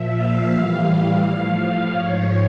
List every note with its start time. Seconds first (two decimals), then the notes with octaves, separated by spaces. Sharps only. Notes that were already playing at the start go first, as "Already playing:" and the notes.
Already playing: A#2 F3 E5
0.17 F5
0.53 A2 E3 G3
1.22 A2 F3
1.90 G#2 F3 C#5